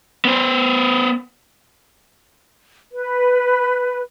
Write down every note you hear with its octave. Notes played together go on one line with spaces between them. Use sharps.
B3 C5
B4